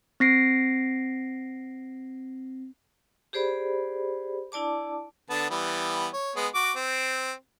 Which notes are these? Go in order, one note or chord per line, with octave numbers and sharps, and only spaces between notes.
C4 A#6 C7 D7
G4 G#4 C5 D5 B5
D4 E4 D5 A5 D6
D3 B3 A5
E3 G3 B3
C#5
G#3 B3
F#4 D6
C4